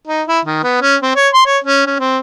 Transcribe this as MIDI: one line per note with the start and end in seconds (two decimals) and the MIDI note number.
0.07 0.23 63
0.28 0.39 64
0.45 0.62 51
0.63 0.77 59
0.82 0.96 61
1.03 1.13 60
1.16 1.29 73
1.34 1.43 84
1.47 1.58 73
1.64 1.86 61
1.86 1.98 61
2.00 2.19 60